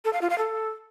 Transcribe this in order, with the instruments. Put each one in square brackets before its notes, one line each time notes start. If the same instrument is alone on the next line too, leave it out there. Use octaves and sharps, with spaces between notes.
[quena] A4
F5
F4
F5
A4